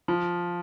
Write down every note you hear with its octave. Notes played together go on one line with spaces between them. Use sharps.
F3